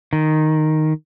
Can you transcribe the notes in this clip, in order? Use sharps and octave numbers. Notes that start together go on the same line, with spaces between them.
D#3